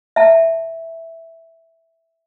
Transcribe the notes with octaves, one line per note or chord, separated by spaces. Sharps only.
E5 A5